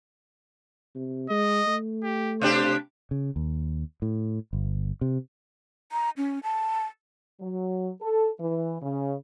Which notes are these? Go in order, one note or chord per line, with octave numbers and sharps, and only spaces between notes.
C3
G#3 D#5
A3
G4
C3 D4 G4 C5
C#3
D#2
A2
G1
C3
A#5
C#4
A5
F#3
A4
E3
C#3